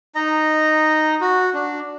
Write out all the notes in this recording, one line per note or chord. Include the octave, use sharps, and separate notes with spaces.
D#4 D#5 A#5
F#4
D4